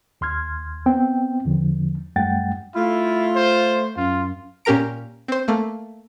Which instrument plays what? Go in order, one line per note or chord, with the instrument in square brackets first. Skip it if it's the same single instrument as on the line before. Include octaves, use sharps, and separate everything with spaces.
[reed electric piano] D#2 C6 F6 G#6
B3 C4 G5
E2 D3 F3
F#2 G3 A3 F#5 G5 A6
[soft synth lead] A3 [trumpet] E4 [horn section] F4
[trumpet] C5
[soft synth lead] F#2 [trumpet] F4
[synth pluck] A#2 C#4 G4 A#4 A#5 D7
C4 C5
A3 A#3